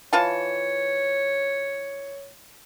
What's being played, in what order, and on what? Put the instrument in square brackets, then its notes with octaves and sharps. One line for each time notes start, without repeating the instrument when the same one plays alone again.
[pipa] E3 F4 A5 [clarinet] C#5